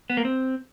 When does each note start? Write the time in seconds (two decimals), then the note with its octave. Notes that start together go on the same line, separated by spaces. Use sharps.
0.10 B3
0.17 A#3
0.25 C4